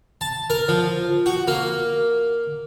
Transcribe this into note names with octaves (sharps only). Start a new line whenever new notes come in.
A5
A#4
F3
F#4
A#3